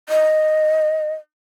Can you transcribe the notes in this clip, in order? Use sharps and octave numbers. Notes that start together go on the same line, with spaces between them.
D#5